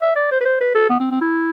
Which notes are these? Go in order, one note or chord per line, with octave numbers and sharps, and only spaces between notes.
E5
D5
C5
B4
C5
B4
A4
B3
C4
C4
E4